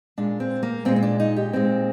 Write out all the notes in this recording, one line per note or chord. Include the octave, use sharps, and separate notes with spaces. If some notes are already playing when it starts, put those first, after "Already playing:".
A#2 G#3 D4
C4
A#3
A#2 G#3 C4
C4
D4
D#4
G4
A#2 G#3 C4